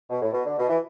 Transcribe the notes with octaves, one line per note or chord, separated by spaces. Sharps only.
B2
A2
B2
D3
B2
E3